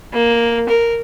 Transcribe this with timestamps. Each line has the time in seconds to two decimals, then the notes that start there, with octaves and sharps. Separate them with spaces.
0.13 A#3
0.69 A#4